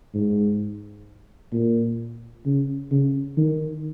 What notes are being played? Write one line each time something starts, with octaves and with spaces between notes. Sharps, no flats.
G#2
A#2
C#3
C#3
D#3